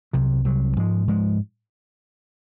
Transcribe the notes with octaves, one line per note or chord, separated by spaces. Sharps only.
C2 C3 F#3
C2 C3 F#3
G#2 F3 G#3
G#2 F3 G#3